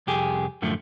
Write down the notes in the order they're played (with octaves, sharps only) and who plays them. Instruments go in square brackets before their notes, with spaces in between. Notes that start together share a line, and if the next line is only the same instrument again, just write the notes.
[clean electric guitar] C2 F2 G4 G#4
F#2 A2 D3 F3 A3